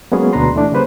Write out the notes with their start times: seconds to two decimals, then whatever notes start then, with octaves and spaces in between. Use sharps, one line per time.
0.12 F#3 G#3 A#3 B3 C#4 G#4
0.33 D2 B2 D4 B4 A#5 C6
0.55 E3 A3 D4
0.72 C#3 G3 A#3 B4 C5